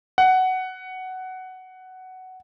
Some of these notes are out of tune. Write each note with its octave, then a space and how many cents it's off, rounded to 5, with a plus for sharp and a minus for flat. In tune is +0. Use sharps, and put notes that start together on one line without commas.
F#5 +10